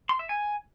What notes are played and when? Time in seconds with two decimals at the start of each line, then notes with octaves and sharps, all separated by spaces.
0.09 C6
0.19 E5
0.29 G#5